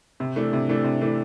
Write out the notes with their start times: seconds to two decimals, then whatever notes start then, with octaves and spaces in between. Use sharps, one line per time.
0.20 C3
0.36 E3 A3 D4
0.53 C3
0.69 E3 A3 D4
0.84 C3
1.01 E3 A3 D4